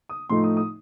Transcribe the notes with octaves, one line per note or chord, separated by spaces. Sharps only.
D#6
A2 F3 A3 D#4 C6
D#6
D#6